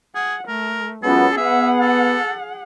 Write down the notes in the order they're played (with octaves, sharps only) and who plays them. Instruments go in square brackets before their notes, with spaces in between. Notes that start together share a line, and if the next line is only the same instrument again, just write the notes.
[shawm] G#4 [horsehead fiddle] F#5
[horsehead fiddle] A3 [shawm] A#4
[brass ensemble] F#2 G#3 B3 [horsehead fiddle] C#4 F4 [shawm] A4
[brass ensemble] B3 [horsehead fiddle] G#4 F#5 [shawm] E5
[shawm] A4